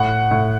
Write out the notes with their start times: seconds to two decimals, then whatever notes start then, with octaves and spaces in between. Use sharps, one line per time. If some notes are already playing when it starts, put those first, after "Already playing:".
Already playing: A2 F#5
0.31 A2